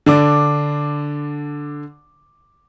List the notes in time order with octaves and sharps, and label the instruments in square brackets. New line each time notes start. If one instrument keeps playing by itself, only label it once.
[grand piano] D3 D4 D6